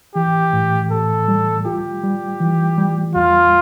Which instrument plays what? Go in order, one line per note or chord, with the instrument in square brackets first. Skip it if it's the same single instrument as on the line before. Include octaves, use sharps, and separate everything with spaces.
[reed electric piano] E3 [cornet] G4
[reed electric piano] A2
[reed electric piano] A2 [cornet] A4
[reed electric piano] G3
[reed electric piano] F4 [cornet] G4
[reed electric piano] G3
E3
G3
[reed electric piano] E2 [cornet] F4